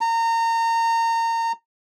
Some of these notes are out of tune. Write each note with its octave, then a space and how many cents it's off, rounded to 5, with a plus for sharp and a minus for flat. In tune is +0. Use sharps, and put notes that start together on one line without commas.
A#5 -30